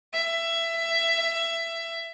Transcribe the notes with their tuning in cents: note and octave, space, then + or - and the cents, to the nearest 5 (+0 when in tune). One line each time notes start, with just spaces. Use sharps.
E5 +15